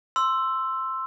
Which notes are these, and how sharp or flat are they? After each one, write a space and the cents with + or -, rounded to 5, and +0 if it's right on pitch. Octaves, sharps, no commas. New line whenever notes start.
C6 +0 E6 +5